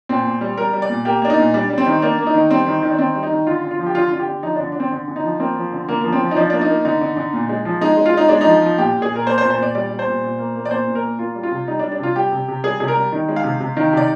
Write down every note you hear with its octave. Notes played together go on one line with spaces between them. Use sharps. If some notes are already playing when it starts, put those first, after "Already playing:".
A#2 C4
A#2
G3
G3 A#4
G3
D5
A#2
A#3 G4
A#3 D4
D#4
A#2
G3 D4
G3
C4
D#3
A#3 D4
A#3
D#4
D#3
G3 C4
D#3
D#3
D4
D#3 C4
G3
D#4
D#3
D3 F4
D3
F4
F3
G4
D3 F4
D3 F4
G4
D3
F3 D#4
D3 D4
D4
D3 C4
D3
D3
D#4
F3
A#3 C4
F3
D3
D3 A#3
F3 A#3
C4
F3
D#4
F3 D4
A#3 D4
D#4
A#3
D3 D#4
D3
D3
A#2
G#3
F3
G#3 D#4
G#3
F4
G#3 D#4
G#3 D4
D#4
F3
F3
A#2 G4
A#2
G#4
A#2
A#4
A#3 C5
C5
A#2
C5
A#2 D5
G3 D5
G3
C5
A#2
A#2
A#3
A#3
D5
A#2 C5
A#2
A#4
A#3
A#3 F4
G3
F4
C3
G3 D#4
D4
G3
D4
C3 F4
G3 G4
C3
C3
G3 G#4
C3 G#4
A#4
G3
D#3
G#3
F5
C3
C3
D#3
C3 D5